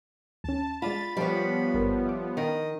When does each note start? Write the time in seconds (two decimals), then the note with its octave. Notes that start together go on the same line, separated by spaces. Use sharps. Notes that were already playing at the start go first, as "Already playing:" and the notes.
0.44 D#2 C#4 A5
0.82 G#3 F4 D5 B5 A6 E7
1.17 F3 G3 B3 C#5
1.74 G#1 G2 A#4
2.06 E5 D6
2.37 D#3 D#5